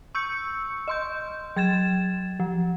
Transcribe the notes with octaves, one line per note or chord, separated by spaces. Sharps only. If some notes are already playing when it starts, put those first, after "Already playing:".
C#6 E6 G6 C#7
D#5 C6 G6
F#3 G#6 A6 E7
F3